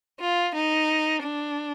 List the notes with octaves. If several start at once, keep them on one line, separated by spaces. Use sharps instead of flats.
F4
D#4
D4